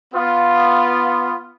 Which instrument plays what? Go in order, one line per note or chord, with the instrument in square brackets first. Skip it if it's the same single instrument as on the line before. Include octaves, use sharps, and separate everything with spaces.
[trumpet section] B3 F4